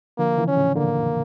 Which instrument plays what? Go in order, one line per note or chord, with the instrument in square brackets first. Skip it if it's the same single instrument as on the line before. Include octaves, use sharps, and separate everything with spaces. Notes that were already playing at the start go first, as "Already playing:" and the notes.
[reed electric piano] D3 F3 [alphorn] A#3
[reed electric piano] C#3 E3
[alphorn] C#4
[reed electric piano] A2 C#3
[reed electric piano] A#2 D3 [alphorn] A#3
[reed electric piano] F2